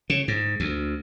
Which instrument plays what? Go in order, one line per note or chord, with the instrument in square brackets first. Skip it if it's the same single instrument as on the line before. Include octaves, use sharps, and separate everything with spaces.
[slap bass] C#3
G#2
D2